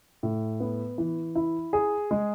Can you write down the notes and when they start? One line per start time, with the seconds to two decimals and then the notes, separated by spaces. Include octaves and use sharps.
0.23 A2
0.60 B3
0.98 E3
1.35 E4
1.73 G#4
2.11 G#3